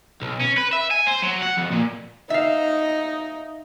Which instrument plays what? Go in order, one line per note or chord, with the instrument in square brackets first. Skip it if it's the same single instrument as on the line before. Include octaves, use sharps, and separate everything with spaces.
[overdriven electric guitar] B1
C#4
B4
E5
G#5
C5
F#3
F#5
F2
A#2
[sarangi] D#4 [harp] E5 F5